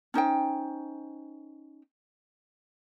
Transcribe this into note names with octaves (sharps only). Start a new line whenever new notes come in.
C#4 D#4 C5 G5